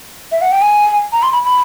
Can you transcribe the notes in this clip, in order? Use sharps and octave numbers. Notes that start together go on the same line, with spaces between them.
E5
F#5
G5
G#5
A#5
C6
B5
B5